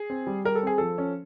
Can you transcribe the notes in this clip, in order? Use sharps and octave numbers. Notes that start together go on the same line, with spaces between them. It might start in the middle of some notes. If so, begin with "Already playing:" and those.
Already playing: G#4
C4
G3
G3 A#4
A4
C4 G#4
F3 A4
C#4